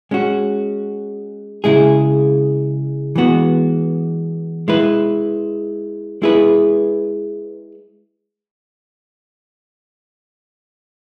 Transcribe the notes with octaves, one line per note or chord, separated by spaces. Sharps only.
G#3 C#4 F#4
C#3 G#3 E4 G#4
E3 G#3 B3 F#4
G#3 E4 B4
G#3 E4 G#4 B4